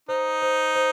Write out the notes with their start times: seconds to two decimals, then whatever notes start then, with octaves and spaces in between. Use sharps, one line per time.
0.08 D#4 C5
0.42 C5
0.75 C5